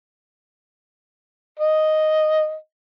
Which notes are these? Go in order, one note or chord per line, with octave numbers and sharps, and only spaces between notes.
D#5